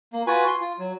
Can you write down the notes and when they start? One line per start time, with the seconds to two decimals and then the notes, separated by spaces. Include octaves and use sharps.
0.13 A#3
0.27 F4 F#4 B4 G#5
0.48 C6
0.61 F4
0.79 F#3